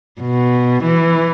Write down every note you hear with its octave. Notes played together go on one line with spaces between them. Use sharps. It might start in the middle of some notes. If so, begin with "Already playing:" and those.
B2
E3